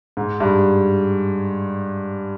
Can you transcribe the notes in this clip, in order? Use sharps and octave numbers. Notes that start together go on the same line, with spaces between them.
G#2
G2